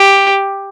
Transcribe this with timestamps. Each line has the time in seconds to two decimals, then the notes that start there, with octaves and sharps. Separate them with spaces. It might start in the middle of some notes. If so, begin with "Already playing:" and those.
Already playing: G4